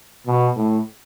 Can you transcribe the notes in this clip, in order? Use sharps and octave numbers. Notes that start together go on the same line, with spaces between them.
B2
A2